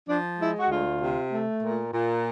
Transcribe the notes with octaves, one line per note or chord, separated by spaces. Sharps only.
F3 D4
G#3 E4
F#4
D2 F4
C3
A3
A#2
A#2